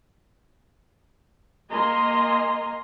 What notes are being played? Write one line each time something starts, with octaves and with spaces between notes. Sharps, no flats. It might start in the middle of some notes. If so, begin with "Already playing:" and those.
A#3 D#5 G#5 A#5 C6